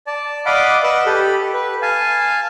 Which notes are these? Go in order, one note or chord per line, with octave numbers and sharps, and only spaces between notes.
D5 A5
D5 D#5 F5 F#5 B5 D6
B4 D#5 F#5 E6 F#6
G4 A4 B5
B4
F5 G#5 A5